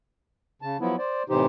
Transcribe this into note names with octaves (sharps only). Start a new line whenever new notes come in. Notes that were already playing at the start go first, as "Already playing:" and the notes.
C#3 A5
F3 F#3 B3 E4
C5 D5
A2 C3 E3 D#4 G4 C5